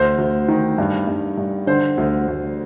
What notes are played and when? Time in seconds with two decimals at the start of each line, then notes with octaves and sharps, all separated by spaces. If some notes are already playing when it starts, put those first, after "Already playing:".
Already playing: D2 C5
0.18 D2
0.48 D#3
0.78 G2
1.07 G2
1.37 G2
1.67 D3 C5
1.98 D2
2.28 D2